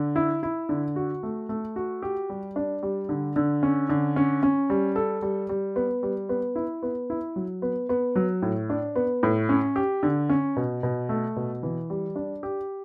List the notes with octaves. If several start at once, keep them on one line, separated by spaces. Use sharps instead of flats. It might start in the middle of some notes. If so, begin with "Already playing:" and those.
Already playing: D3
E4
E4
D3
F#4
A3
A3
F#4
G4
G3
D4
G3
D3
D3
C#4
D3
C#4
C#4
G3
A4
G3
G3
B3
G3
B3
E4
B3
E4
F#3
B3
B3
F#3
A2
D4
B3
A2
C#4
G4
D3
C#4
B2
B2
A3
B2
E3
G3
D4
G4